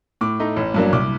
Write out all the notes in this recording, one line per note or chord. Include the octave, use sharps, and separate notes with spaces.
A2 D6
A3 D#4
A1
G2 F#3 A#3 D4
C2 D6